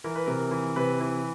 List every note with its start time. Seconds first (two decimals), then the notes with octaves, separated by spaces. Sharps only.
0.04 E3 A#4
0.15 B4
0.26 C3 A#4
0.51 E3
0.76 C3 B4
1.00 E3